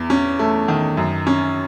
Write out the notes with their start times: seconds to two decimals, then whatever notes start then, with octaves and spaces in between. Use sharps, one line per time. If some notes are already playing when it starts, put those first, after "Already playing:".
Already playing: E2
0.10 C#4
0.39 A3
0.68 D#3
0.97 F#2
1.27 C#4